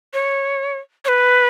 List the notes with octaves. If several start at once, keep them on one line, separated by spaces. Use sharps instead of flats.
C#5
C#5
B4